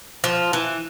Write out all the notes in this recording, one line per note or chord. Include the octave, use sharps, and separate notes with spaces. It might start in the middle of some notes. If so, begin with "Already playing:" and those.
F3
E3